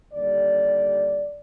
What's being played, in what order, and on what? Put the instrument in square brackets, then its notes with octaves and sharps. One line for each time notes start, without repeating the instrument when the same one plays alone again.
[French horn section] D#2 D3 G3 D5